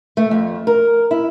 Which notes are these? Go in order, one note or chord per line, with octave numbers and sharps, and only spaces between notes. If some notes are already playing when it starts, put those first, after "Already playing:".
A3
F2
A#4
E4